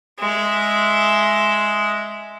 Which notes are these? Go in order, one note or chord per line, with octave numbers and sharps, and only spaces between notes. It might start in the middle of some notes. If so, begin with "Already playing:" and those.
G#3 E5